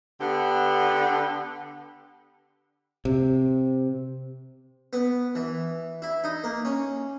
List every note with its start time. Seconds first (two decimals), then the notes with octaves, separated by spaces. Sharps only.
0.20 D3 B3 G4
3.05 C3
4.93 B3
5.35 E3
6.02 E4
6.24 D#4
6.44 A#3
6.65 C#4